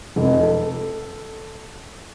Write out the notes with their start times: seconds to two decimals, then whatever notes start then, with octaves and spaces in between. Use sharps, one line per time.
0.16 F1
0.42 A4